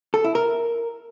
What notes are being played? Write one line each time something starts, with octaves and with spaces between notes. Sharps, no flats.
A4
E4
A#4